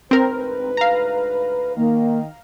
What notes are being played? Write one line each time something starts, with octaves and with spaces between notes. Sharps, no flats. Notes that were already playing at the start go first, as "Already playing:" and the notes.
D2 G#2 C4 A#4 B4
F5 A#5
D#3 A#3